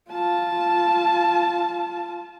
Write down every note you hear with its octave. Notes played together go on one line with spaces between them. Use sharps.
F4 A5